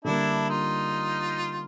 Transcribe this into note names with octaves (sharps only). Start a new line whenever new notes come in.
D3 G3 A#3 D4 E4
D#4 F4